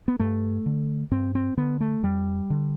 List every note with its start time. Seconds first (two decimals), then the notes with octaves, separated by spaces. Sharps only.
0.08 B3
0.19 G2 A3
0.66 D3
1.11 G2 C4
1.35 C4
1.57 D3 B3
1.80 A3
2.03 F2 G3
2.50 D3